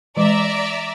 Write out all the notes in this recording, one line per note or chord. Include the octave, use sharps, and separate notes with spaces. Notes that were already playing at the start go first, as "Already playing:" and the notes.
E3 G#3 D5 E5 A#5